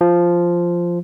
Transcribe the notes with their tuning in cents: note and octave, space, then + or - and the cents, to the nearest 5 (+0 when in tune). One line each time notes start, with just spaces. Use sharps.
F3 -5